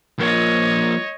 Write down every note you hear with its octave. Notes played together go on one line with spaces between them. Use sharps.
F3 A#3 C#5 D#5